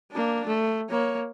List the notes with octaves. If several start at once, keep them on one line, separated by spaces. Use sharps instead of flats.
A#3 D4
A3
A#3 C#5